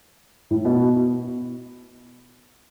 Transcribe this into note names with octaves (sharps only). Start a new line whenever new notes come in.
A2
B2